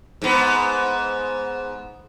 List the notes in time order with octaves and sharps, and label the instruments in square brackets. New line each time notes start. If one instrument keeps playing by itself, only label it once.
[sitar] G#2 B3